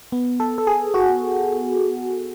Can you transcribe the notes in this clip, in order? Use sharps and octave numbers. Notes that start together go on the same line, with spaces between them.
B3
A4
A4
G#4
F#4